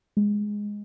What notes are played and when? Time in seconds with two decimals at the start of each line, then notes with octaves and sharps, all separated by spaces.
0.17 G#3